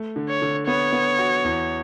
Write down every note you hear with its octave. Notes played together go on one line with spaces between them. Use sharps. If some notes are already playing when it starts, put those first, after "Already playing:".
Already playing: A3
D3
C#5
D3
B3 C#5
B3
F#4
E2